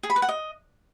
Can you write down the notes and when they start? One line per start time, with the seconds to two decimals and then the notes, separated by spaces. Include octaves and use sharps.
0.03 G#4
0.10 B5
0.16 B4
0.22 F#5
0.29 D#5